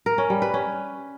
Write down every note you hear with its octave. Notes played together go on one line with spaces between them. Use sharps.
A#4
C#4
G3
B4
C#4